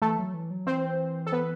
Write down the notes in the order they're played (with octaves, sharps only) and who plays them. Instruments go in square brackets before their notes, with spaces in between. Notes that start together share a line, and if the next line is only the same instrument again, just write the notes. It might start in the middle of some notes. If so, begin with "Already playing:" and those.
[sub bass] E3 [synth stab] A3 A4
[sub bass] F#3
E3
F#3
[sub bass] E3 [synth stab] C4 C5
[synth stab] A4
B3 B4